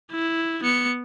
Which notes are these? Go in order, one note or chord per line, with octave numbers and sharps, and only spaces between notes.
E4
B3 C#7